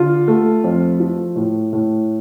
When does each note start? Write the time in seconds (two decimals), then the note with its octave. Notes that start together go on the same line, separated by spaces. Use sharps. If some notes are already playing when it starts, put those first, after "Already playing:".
Already playing: D3 F4
0.28 A3
0.64 F2
1.00 F3
1.36 A2
1.73 A2